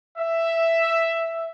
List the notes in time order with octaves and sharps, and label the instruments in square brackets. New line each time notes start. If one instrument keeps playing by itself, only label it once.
[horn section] E5